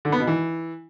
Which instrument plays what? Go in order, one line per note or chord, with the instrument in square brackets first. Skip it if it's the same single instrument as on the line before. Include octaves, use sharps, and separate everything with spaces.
[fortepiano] D3
B3
B2
E3